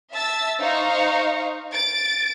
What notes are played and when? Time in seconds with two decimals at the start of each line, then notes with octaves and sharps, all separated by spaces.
0.13 E5 A5 E6 A6
0.60 D#4 C5 F5 C#6
1.73 A6 D7